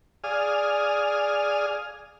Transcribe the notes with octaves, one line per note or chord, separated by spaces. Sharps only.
G#4 D5 F5 G#5 D#6 F6